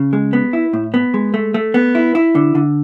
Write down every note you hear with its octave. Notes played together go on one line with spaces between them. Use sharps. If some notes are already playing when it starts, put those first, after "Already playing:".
Already playing: C#3
G#3
B3
E4
A2
B3
G#3
A3
A3
B3
E4
E4
D3
D3